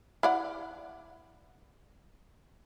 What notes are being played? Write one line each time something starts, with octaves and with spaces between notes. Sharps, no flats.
E4 D5 F#5